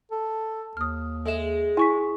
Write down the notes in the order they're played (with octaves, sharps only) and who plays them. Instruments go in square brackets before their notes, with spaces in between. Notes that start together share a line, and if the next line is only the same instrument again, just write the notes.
[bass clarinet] A4
[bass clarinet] D#2 [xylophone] D#6 F6
[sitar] G#3 [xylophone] A4 E5 E7
[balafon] E4 [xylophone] G#5 C#6 B6